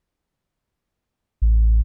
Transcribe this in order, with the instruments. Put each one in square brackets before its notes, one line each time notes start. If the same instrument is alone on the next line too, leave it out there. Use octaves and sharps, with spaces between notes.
[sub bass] A1